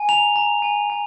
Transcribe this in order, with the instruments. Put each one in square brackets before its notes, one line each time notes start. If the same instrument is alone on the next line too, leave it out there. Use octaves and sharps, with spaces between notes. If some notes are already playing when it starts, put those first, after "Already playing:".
Already playing: [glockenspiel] G#5
A#5 F7
A#5
G#5
G#5